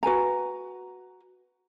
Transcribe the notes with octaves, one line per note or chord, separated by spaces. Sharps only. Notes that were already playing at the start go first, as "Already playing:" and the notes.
F#4 B4 G#5 A#5